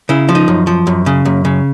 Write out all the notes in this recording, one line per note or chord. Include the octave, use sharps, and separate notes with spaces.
C#3 E4
F3
D#4
F#2
F3
F#2
C#3
F#2
C#3